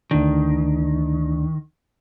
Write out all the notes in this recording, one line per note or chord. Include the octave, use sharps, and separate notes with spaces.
D2 D#3 D4